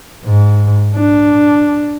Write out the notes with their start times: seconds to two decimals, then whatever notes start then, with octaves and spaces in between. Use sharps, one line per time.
0.25 G#2
0.96 D4